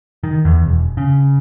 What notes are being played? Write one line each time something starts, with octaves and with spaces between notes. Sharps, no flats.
D#3
E2
E1
C#3